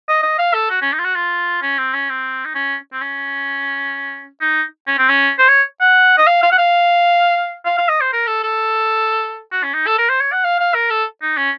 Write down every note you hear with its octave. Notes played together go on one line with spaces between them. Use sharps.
D#5
D#5
F5
A4
F#4
C#4
D#4
F4
F#4
F4
C#4
C4
C#4
C4
D#4
C#4
C4
C#4
D#4
C#4
C4
C#4
C5
C#5
F#5
D#5
F5
F5
F#5
F5
F5
F5
D#5
C5
A#4
A4
A4
F#4
C#4
D#4
A4
A#4
C5
C#5
F#5
F5
F5
A#4
A4
D#4
C#4